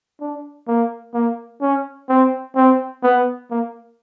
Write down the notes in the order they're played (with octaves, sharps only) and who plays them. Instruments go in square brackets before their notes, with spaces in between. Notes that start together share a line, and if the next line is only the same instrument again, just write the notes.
[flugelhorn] D4
A#3
A#3
C#4
C4
C4
B3
A#3